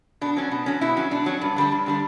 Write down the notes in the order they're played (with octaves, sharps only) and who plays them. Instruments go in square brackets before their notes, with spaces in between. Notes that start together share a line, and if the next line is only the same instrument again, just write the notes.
[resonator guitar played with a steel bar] B2 D4
F#3 C#4
B2
F#3 C#4
B2 E4
F#3 C#4
B2 D4
F#3 C#4
G2
D3 G3 D4
G2
D3 G3 D4